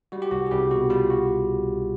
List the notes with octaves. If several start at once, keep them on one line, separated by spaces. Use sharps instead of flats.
G3 F#4
G4
C2 F#4
G#4
C2 G3 G4
B2 F#4
G3 F4
F#4